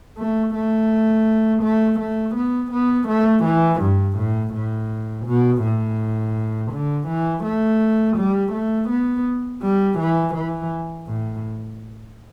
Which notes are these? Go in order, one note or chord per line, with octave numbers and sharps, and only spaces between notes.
A3
A3
A3
A3
B3
B3
A3
E3
G2
A2
A2
B2
A2
D3
E3
A3
G3
A3
B3
G3
E3
E3
A2